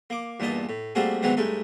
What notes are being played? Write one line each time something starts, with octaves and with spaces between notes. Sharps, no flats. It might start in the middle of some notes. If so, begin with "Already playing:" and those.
A#3 D6
E2 G2 A#2 D#5 A5
A2
G3 A3 A#3 C4 F#4 G#4
D#3 E3 F#3 G#3 B3 C4
G2 G#3 A3 D#4